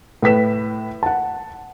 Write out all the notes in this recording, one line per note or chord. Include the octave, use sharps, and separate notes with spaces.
A2 B4 B6 E7
F#5 A5